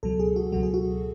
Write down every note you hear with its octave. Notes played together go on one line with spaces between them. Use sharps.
C#2 B2 F#3 A4
G#4
F#4
C#2 B2 F#3 F#4
G#4
F#4